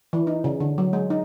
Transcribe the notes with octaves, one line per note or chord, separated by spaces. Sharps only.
E3
D#4
C#3
D3
F#3
G#3
D#4